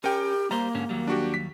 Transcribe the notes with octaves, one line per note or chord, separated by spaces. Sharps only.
C#4 G4 A#4 G5
G3 A#3 C5 A#5
G#2 D3 C#4
D#2 F#3 G3
D4 F#4 G4
B6